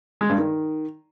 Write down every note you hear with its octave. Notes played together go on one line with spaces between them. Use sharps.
G#3
G2
D#3